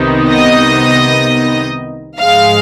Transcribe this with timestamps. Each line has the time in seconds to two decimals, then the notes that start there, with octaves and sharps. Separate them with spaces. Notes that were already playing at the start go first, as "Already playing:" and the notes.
Already playing: C2 C3 D#3 B3 D#4
0.30 D#5
2.20 G#2 F3 G#3 F5